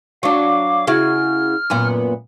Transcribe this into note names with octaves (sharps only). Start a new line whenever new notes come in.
F#3 D4 F5 D6
C#3 E4 F#4 F6
F#2 A#2 B3